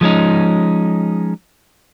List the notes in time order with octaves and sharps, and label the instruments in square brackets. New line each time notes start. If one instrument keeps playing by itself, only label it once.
[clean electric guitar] F3 G#3 C#4 D#4